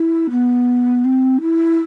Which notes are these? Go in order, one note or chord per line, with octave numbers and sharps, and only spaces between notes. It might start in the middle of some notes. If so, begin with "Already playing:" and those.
Already playing: E4
B3
C4
E4